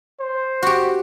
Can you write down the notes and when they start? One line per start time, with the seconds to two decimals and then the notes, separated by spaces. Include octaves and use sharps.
0.20 C5
0.63 F#4 G4